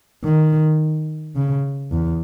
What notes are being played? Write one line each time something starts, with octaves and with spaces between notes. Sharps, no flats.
D#3
C#3
E2